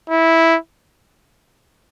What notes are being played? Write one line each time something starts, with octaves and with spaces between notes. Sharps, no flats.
E4